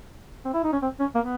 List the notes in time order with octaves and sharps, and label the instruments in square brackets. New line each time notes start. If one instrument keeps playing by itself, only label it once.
[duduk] C4
E4
D#4
C#4
C4
C#4
A#3
B3